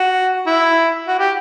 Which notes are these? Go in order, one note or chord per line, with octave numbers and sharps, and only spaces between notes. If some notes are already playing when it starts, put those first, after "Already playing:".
Already playing: F#4
E4
F#4
G4